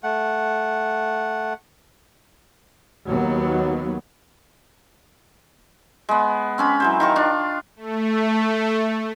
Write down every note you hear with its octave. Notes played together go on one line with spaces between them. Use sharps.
A3 F#5
D#2 F#3 B3
G#3 B3
C4 C#4 B5
E3 F#3 C5
D#3 F4 C#6
D4 F4 G5
A3